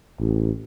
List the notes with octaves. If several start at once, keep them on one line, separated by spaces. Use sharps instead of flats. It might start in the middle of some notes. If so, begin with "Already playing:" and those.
A1